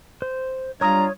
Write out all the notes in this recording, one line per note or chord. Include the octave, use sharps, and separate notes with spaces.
C5
G3 D4 F4 C#5 A#5 D#6